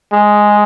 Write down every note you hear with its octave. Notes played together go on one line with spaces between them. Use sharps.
G#3